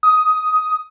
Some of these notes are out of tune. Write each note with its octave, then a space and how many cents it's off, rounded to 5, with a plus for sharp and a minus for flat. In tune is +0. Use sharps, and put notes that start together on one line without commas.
D#6 +10